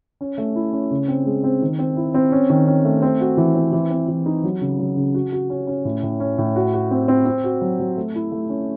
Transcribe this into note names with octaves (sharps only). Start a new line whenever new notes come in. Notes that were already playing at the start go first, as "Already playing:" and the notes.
C#4
A3
E4
C#4
C#3
C4
G#3
C4
D#3
C4
E4
C4
C#4
D#3
C#4
A3
C4
F#4
E3
C4
E3
C4
E3
D#4
F#3
C#3
F#3
C#3
F#4
F#4
C#4
C#4
A2
A2
C#4
A2
F#4
F#4
C4
C4
C4
F#4
F#3
F#3
A3
E4
A3
C#4